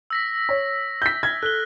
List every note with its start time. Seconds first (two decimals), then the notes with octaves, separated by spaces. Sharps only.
0.10 E6 A#6 B6
0.49 C#5
1.02 G6 B6
1.23 F6 G#6
1.43 A4 F#6 G7